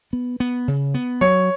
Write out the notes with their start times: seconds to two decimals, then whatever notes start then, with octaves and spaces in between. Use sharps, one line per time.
0.13 B3
0.40 B3
0.68 C#3
0.94 B3
1.21 F#3 C#5 C#6